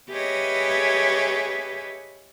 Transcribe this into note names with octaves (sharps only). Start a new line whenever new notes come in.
G4 G#4 B4 C#5 D#5 E5